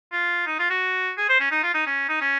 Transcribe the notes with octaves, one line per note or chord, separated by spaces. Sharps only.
F4
D#4
F4
F#4
G#4
C5
C#4
D#4
F4
D#4
C#4
D#4
C#4